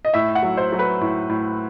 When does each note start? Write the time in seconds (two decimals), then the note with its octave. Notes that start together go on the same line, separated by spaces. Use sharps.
0.05 D#5
0.14 A2 E5
0.35 F#5
0.42 F#3
0.57 C5
0.72 F#3
0.79 B4
1.01 A2
1.30 A2